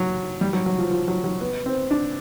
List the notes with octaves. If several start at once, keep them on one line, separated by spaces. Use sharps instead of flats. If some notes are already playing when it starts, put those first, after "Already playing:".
Already playing: F#3
G3
F#3
F#3
F3
F3
F#3
F#3
B3
C4
D4